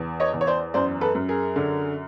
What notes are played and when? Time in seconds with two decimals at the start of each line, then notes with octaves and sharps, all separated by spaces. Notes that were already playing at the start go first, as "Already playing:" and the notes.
Already playing: E2
0.20 C#5 D#5
0.34 E2
0.41 C#5
0.47 C5 D5
0.74 F#2 C5 D5
1.01 A4 B4
1.15 F#2
1.29 G#4 A#4
1.56 D3